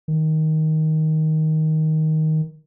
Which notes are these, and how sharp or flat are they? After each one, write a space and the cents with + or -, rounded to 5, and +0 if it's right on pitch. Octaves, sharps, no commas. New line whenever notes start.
D#3 +10